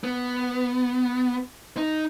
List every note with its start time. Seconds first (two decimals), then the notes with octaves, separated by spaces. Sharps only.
0.04 B3
1.77 D#4